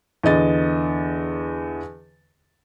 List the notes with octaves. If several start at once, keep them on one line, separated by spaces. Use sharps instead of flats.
E2 D3 D#5 A6